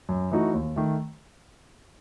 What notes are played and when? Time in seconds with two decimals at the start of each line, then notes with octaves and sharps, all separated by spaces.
0.09 F#2
0.31 E3 A3 D#4 F#4
0.54 D#2
0.76 D#3 A3